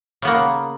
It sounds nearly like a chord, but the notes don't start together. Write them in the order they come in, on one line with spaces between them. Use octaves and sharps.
C#3 B3 A#3